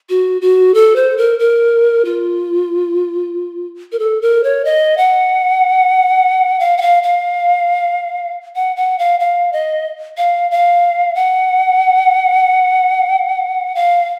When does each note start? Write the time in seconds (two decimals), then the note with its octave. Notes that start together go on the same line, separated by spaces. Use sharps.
0.09 F#4
0.41 F#4
0.74 A4
0.96 C5
1.18 A#4
1.39 A#4
2.05 F4
3.92 A#4
3.99 A4
4.22 A#4
4.44 C#5
4.65 D#5
4.98 F#5
6.60 F5
6.78 F#5
6.82 F5
7.03 F5
8.55 F#5
8.76 F#5
8.99 F5
9.20 F5
9.53 D#5
10.18 F5
10.51 F5
11.15 F#5
13.75 F5